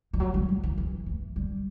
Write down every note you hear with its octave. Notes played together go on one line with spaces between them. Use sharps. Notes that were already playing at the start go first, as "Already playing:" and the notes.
F3
F#3
G3
F3
E3
E3
E3
G3